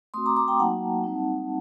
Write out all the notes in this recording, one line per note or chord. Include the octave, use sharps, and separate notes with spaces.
A3 C4 F#4 C6 D#6
A#5 D6
A#5 D6
G5 A#5
F#3 A#3 D#4 F#4 F#5 A5
G3 C4 D#4